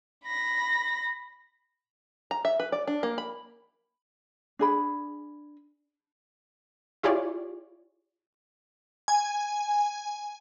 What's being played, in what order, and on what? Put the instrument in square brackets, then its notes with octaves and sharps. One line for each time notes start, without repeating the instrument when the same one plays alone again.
[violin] B5 A#6
[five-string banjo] A#5
E5
B4
D5
D4
A#3
B5
[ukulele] D4 G#4 B5
[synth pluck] E4 F4 G4 G#4 C#5 D5
[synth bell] G#5